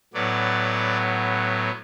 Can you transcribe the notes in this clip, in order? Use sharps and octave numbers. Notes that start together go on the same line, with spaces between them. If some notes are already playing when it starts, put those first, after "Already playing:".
A2 F#3 B3 D5